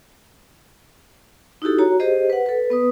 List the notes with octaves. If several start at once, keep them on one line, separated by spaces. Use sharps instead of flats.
D#4 E4 F#4 G4 A4
F#4 C#5 A#5
G4 G#4 C5 D#5
B4 F#5
A4 B4
B3 B4 D#6